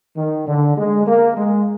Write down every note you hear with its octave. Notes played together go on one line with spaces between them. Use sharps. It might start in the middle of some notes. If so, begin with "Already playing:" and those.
D#3
D3
G#3
A#3
G#3